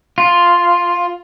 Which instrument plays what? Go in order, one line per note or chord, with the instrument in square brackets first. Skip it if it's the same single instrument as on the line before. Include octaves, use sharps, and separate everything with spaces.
[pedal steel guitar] F4